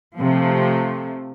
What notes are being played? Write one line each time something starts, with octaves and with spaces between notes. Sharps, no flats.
C3 F3 A3